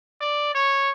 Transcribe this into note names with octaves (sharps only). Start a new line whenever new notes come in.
D5
C#5